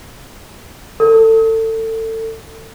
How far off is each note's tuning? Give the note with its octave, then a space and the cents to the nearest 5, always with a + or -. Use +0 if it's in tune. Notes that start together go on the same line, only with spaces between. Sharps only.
A4 +25